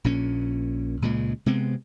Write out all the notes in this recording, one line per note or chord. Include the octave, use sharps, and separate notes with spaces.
A#1 A#2 C#4
C#2 A#2 C#3 G#3
C3 G#3 B3 C4